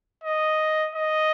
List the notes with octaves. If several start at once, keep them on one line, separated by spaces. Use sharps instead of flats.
D#5
D#5